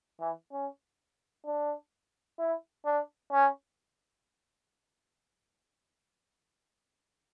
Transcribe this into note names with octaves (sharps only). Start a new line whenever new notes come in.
E3
C#4
D4
E4
D4
C#4